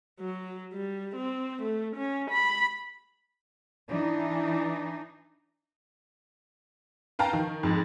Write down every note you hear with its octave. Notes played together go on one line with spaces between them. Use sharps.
F#3
G3
C4
A3
C#4
B5
E3 D4 D#4
B4 F5 G5 A5 A#5
D#3
F2 G#2